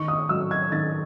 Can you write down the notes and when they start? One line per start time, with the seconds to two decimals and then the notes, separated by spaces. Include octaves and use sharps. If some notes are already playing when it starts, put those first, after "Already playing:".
Already playing: D#3 C#6
0.08 D#6
0.29 F#3 E6
0.51 G#6
0.72 D#3 A6